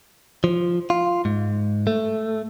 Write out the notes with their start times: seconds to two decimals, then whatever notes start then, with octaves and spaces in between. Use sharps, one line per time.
0.44 F3
0.90 F4
1.25 G#2
1.87 A3